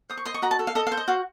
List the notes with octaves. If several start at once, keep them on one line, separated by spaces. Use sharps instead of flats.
C5 D#6
C#6
D#5 C6
C#6
F#4 A#5
A5
A4
F5
A4 D#5
F5
C5
D#5
F#4 F5